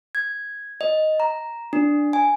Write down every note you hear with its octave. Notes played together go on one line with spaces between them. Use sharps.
G#6
D#5
A#5
D4
G#5